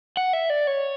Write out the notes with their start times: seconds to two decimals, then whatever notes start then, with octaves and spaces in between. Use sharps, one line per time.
0.17 F#5
0.33 E5
0.50 D5
0.67 C#5